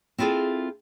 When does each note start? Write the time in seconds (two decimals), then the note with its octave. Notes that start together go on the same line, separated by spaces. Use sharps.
0.18 C4 E4 F4 G#4 A4